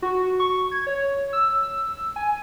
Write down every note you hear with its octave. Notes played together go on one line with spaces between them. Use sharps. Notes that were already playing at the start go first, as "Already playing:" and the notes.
F#4
C#6
G#6
C#5
E6
G#5